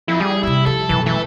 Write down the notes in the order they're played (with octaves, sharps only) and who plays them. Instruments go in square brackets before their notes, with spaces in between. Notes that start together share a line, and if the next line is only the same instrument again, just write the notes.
[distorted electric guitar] F2 [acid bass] E4
[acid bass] G3 [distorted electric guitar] G#4
[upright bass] E2 C3 [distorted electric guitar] E4
[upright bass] F3 [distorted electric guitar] A4
[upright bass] F#2 B2 [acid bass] E3
[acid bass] E3 [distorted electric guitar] A4 E5